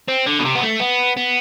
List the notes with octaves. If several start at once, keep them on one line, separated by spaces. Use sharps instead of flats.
C4
D3
B2
C3
B3
A3
B3
B3